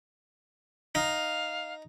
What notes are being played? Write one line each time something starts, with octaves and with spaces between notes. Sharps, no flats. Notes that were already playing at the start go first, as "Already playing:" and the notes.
D#4 F5